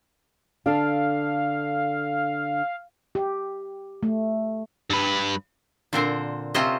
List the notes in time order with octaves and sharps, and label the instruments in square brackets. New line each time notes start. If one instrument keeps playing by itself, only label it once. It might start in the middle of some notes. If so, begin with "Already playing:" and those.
[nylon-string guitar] D3 D4 A4 [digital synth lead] F5
[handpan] G4
A3
[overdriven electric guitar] G2 B4
[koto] A#2 D3 C4 A4 A#4 C5
C3 C4 C#4 F4 C5 D#5